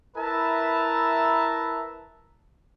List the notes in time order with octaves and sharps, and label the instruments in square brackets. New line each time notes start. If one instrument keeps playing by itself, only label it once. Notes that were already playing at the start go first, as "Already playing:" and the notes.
[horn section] E4 A#4 B4 E5 A5 A#5